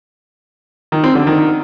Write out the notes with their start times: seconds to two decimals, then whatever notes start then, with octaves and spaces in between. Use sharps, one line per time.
0.92 D#3
1.04 C4
1.15 D3
1.27 D#3